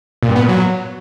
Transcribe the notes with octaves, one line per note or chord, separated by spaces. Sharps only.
A#2
G2
B3
A#2
F#3